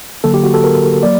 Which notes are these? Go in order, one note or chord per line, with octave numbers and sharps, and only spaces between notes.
D3 F#3 A#3 A4
G4
F#4
A4
A#4
F#3 A#3 D5